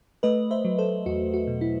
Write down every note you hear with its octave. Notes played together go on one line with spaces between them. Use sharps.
A3 B4 D#5
C5 E5
F#3
A4 C5
E2 F#4
F#4
B2
E4